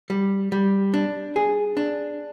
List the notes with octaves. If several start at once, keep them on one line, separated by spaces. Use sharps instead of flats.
G3
G3
D4
G#4
D4